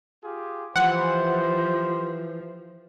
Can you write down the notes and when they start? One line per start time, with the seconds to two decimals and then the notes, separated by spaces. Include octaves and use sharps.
0.23 F4 G4 G#4
0.76 E3 F3 G4 C5 F#5